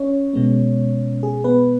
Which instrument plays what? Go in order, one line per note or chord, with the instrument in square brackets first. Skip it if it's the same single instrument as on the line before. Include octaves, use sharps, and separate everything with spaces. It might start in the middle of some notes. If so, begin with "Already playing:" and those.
Already playing: [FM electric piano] C#4 C#5
B2 G#3 B3
G#4
B3 B4